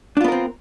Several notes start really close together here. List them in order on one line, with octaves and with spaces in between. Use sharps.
D4 F4 B3 A#4 C4